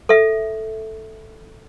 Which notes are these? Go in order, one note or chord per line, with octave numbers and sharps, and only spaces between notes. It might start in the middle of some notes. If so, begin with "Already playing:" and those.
A4 E5